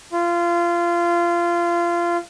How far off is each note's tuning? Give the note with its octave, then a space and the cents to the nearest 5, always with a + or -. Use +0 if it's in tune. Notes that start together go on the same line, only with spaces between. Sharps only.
F4 -20